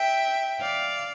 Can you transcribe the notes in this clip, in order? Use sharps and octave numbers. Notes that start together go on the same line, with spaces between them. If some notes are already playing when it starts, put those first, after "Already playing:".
Already playing: E5 G5
D5 F5